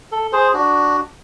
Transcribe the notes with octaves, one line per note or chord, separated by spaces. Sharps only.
A4
G#4 C5
D4 F#4